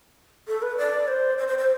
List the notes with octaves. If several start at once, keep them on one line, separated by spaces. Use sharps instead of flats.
A4
B4
D5
C5
C5
C5
C5